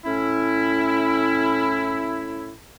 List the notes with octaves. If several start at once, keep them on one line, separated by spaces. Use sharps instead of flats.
A2 C#4 E4